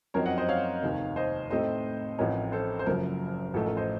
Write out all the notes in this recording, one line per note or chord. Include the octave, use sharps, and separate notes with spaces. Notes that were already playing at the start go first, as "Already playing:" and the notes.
F#2 F3 C4 D#4 A#4 C#5
D#5 F#5
C5 D#5
C#5 F5
F1 D#2 D#3
C5 D#5
A2 A3 C4 D#4 C5 D#5
A1 A2 F3 C4 D#4 A#4 C#5
A4 C5
C5
F#1 F#2 F3 A#4
A1 A2 F3 A3 D#4 A4
A#4
C5 D#5